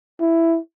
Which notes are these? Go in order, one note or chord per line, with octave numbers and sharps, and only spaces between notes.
E4